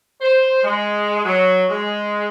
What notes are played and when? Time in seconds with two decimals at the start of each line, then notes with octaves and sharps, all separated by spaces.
0.21 C5
0.63 G#3
1.25 F#3
1.70 G#3